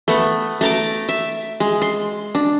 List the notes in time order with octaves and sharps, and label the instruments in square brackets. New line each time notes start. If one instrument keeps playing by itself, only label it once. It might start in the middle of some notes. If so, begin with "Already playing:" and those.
[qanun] A3 B3
A3 A#5 D6
E5
G#3
C6
D4